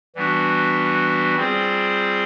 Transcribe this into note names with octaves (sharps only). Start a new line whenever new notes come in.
E3 G3 B3 D4 F#4
G3 C4 F4 G#4 C5